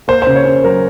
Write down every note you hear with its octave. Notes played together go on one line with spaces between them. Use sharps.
A#3 C5
C#3 C5
C#5
C#4
F#3 A#4